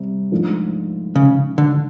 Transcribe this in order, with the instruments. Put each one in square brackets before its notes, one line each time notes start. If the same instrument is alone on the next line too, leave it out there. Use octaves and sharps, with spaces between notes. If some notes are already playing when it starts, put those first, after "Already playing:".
Already playing: [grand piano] C3 G3
G#2 F3 A3 D4
[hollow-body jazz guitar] C#3
D3